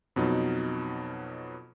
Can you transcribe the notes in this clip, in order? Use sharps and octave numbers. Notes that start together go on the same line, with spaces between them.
F2 B2 F#3 D#4